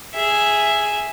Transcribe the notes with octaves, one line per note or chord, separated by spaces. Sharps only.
G#4 E5